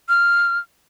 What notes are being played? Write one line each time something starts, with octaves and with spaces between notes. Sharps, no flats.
F6